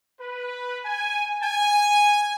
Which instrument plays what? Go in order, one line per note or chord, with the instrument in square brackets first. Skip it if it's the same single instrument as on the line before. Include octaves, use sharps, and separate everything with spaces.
[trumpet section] B4
G#5
G#5